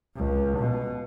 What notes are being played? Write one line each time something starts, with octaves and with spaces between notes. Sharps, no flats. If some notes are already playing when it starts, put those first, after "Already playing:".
C#2
B2